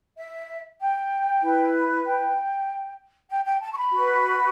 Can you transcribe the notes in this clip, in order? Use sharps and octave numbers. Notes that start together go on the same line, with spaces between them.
E5
G5
E4 B4
G5
G5
G5
A5
C#6
B5
F#4 B4